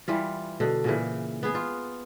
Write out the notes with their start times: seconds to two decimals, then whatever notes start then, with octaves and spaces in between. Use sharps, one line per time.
0.08 E3 G3 F4
0.60 B2 D3
0.84 A#2 C#3 E3
1.43 B3 G#4
1.55 F4